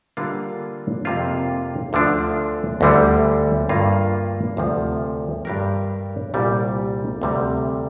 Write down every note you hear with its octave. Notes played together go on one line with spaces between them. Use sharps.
D3 G3 A#3 D4 F4
F2 C3 A#3 F4 C5
D2 D3 F3 D4
D2 D3 G3
G2 D3 A#3 F4
D2 C3 F3
G2 G3 D4 G4 A#4
C2 A#2 G3
D2 C3 G3